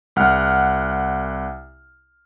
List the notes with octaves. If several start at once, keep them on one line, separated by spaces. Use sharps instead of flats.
C2 F#5 F6